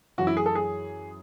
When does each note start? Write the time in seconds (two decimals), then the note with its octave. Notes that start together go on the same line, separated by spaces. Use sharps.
0.18 F#2 E3 F#4
0.27 E4
0.37 G#4
0.46 A4
0.55 G#4